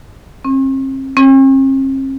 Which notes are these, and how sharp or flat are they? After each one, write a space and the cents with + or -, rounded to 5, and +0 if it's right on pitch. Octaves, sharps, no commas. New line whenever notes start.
C4 +40
C4 +45